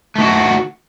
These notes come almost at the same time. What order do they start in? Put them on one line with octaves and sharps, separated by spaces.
A3 D#3 F#4